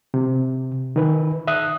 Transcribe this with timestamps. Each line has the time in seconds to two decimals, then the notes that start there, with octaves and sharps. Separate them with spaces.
0.14 C3
0.96 D#3 B4
1.47 E5 D#6 F#6